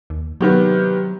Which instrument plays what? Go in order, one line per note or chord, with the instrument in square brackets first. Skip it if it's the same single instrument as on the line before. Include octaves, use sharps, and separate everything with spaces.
[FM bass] D#2
[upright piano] C3 D#3 B3 [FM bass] F#3